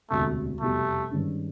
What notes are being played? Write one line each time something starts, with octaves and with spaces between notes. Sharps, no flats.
E1 D2 C3 A3
F1 E2 B2 G3 A3
G2 D#3 G#3 C#4